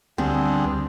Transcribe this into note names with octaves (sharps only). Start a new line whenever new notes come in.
D2 G3 B3 C4 D4 G#4